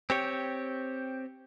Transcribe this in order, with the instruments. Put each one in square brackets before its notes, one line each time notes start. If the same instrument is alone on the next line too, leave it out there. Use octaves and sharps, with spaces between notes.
[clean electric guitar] C4 G4 C#5